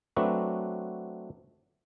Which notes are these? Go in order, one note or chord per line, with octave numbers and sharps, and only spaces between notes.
F#3 A3 C4 D4 F#4 B4